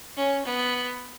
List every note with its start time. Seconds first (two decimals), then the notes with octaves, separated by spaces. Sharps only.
0.17 C#4
0.45 B3